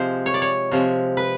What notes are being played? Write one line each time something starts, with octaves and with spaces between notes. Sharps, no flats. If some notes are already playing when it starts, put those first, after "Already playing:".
Already playing: C3 F3 G#3 C5
C#5
D5
C#5
C3 F3 G#3
B4